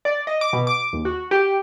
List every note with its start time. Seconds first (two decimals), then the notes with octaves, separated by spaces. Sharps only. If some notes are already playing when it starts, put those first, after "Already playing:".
0.05 D5
0.27 D#5
0.41 D6
0.53 B2
0.67 D6
0.93 D#2
1.05 F#4
1.31 G4